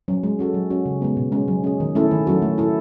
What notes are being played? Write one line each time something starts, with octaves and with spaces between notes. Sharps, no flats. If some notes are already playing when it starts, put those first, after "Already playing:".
F#3 C#4
G#3
C#4 F#4 A4
F#3
C#4 F#4
C#3
G#3 B3
B2
G#3 C#4
F#3
C#4 G#4
D#3
A3 C#4 E4 A4
D#3
F#3 C#4 F#4 A4
A3
E4 A4